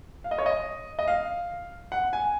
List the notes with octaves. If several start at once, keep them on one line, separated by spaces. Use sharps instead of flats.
F5
D#5
C#5
D#5
D#5
F5
F#5
G#5